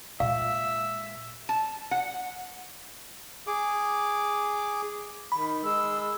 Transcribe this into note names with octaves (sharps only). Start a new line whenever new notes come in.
A#2 G#3 E5 F5
A5
F#5
G#4 D6
D#3 B5
G#3 E6